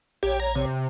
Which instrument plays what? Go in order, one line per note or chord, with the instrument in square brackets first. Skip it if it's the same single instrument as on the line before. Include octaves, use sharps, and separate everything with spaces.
[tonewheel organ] A#1 C#5 [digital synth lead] G4
[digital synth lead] A#5
C3